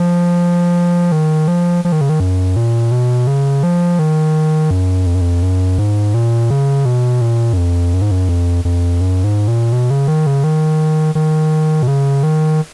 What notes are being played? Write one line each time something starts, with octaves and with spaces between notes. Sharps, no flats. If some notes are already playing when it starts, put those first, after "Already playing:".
Already playing: F3
D#3
F3
F3
D#3
C#3
D#3
F#2
A#2
B2
C#3
F3
D#3
F#2
F2
F#2
F2
F#2
G#2
A#2
C#3
B2
A#2
F#2
F2
F#2
G#2
F#2
F2
F2
F#2
G#2
A#2
B2
C#3
D#3
C#3
D#3
D#3
B2
C#3
D#3